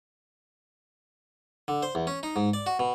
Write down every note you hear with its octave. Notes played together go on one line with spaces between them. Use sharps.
D3
C5
E2
C#4
D#4
G#2
D5
F#4
B2